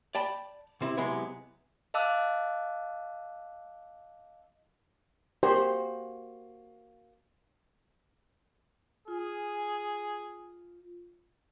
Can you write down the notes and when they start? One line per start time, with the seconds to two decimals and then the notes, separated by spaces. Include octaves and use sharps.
0.15 D5 G5 A5 B5
0.81 C3 C4 E4
0.97 C3 F#3 G#3 B3 E4 G#4
1.94 D#5 F5 A5 D6 E6 F#6
5.43 A#3 F#4 G4 C5 D#5
9.08 F4 G#4